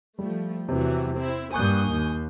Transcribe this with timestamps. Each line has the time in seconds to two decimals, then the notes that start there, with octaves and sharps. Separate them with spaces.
0.19 F3 G3 A3
0.69 E2 C3 E3 F#3
1.16 C4 E4
1.52 G2 A#3 G#5 C#6 D#6 F#6 G6
1.91 D#2